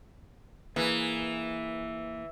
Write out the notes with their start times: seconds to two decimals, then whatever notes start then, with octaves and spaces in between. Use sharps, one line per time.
0.76 E3 A#3 G#4 B4